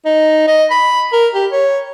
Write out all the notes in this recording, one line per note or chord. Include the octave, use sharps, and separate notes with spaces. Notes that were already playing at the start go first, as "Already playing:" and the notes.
D#4
D#5
B5
A#4
G4
C#5